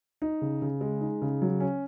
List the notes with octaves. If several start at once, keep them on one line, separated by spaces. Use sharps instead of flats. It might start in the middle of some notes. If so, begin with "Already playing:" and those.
D#4
C#3
C#3
G#3
D#4
C#3
F#3
C#4